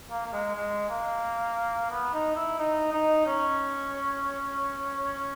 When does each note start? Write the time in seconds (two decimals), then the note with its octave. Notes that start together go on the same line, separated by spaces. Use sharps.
0.10 A#3
0.26 A#3
0.33 G#3
0.56 G#3
0.89 A#3
1.90 B3
2.13 D#4
2.36 E4
2.59 D#4
2.93 D#4
3.27 C#4